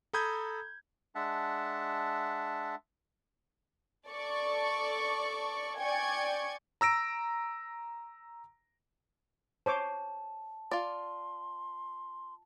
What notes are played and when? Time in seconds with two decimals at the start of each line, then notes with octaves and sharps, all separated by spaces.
0.13 A4 A#5 B5 D#6 G6 G#6
1.15 G#3 D4 E5 F#5 A5
4.09 A4 D5 C#6
5.78 D5 G5 G#5 C#6 G#6
6.81 A#5 E6 A#6 D7
9.66 C5 C#5 A5 D6
10.71 F4 D5 C6